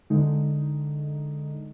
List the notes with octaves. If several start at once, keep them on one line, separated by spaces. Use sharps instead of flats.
D3 G#3 D#4